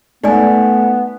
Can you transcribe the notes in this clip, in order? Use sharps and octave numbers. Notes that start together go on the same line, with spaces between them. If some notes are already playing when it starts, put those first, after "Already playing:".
A3 B3 D#4 D5 G#5